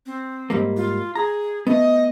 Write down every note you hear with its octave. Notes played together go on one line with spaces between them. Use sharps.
C4
G#2 G3 A#3
F4
G#4 A#5
A3 B3 D#5